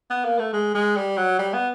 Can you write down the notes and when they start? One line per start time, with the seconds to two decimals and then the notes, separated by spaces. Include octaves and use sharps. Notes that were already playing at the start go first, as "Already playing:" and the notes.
0.10 B3
0.25 A#3
0.39 A3
0.53 G#3
0.74 G#3
0.96 G3
1.17 F#3
1.39 G3
1.54 B3